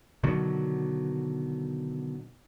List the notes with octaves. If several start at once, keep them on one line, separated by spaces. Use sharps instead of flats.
B2 D3 D#3 F#3